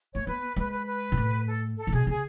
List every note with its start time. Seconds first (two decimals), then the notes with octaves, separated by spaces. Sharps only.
0.13 A3 C#5
0.27 B3 B4
0.56 G#3 B4
0.72 B4
0.86 B4
1.12 B2
1.17 A2
1.47 A4
1.78 A4
1.87 C#3
1.92 B2 G#4
2.07 C#3 G#4